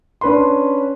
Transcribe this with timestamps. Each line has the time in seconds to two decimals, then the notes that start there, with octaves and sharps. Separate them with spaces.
0.21 C#4 D4 B4 B5 C6